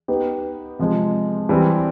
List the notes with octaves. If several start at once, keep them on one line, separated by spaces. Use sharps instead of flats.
B3 D#4 G4 B4
C3 F3 G#3
E3 G3 C4